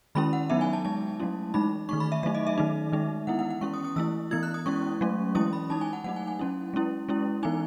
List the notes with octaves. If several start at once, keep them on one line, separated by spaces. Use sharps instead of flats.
D#3 G#3 C#4 E4 B5
F#5
F#3 B3 D#4 E5
G#5
A5
G#3 D#4 A5
F#3 A3 C#4 E4
E3 G#3 D#4 B5
D#3 A3 D#4 C#6
B5
E5
F#3 A3 D#4 E5
D#5
E5
D#3 A3 D#4
D#3 G#3 D#4
E3 B3 E4 F#5
F#5
F#5
G#3 C#4 E4 C#6
D#6
D#6
E3 A3 E4 E6
E3 B3 E4 G#6
F#6
D#6
G#3 C#4 E4 C#6
F#3 A3 C#4
E3 G#3 C#4 E4 D#6
B5
G#3 D#4 A5
G#5
F#5
F#3 A3 D#4 F#5
G#5
G#5
F#3 C#4 E4
G#3 C#4 E4
G#3 C#4 E4
E3 B3 D#4 G#5